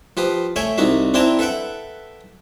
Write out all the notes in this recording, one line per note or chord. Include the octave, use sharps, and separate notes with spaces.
F3 G4 B4 D#6
A3 C#5 E5 G5 G#5
C2 D#4 F#4 E5
C4 D4 E4 G5 A5 A#5
A4 B4 E5 F#5 G5